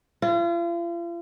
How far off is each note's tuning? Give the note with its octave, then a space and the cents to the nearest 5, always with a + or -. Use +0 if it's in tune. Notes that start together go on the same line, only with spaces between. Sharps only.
F4 -40